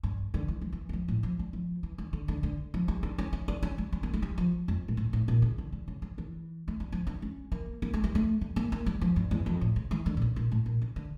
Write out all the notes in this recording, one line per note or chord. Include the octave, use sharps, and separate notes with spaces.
G2
D3
E3
F3
E3
E3
F3
A2
F3
G3
F3
E3
D3
D3
D3
D3
F3
G3
D4
C#4
C#4
D4
C#4
G3
C#4
A#3
A3
G3
F3
F2
A#2
A2
A2
A#2
C#3
D3
D3
C#3
C#3
E3
A3
G3
F3
D4
C#4
A#3
A#3
A3
G3
A3
G3
A#3
A#3
G3
F3
G2
E2
F2
A2
C#3
E3
D3
A#2
C#3
A#2
A2
A#2
C#3
D3